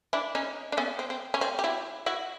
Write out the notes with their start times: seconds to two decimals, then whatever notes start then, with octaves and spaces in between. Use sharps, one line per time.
0.13 D4 E4
0.35 C#4 D#4
0.72 D4
0.77 B3 C#4
0.99 C4
1.10 C4
1.34 C#4
1.41 C4
1.59 G4
1.64 E4 F#4
2.06 E4 F#4